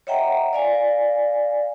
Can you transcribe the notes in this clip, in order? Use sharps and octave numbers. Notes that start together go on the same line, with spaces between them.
C#5 D#5 E5 F#5 G5 A#5
D5 F5 G#5